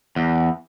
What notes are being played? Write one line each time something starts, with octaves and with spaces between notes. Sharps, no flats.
E2